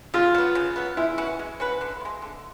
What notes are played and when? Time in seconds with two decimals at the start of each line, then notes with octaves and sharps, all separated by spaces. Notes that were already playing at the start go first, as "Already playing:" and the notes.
0.14 C#3 F4
0.34 F#3 B3
0.55 C#3
0.76 F#3 B3
0.97 G#3 E4
1.18 C#4 F#4 B4
1.39 G#3
1.60 C#4 F#4 B4
1.81 D3
2.01 F3 G#3
2.22 D3